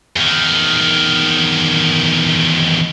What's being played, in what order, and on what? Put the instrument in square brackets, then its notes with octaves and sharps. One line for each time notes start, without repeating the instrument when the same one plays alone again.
[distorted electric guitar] E2 D#3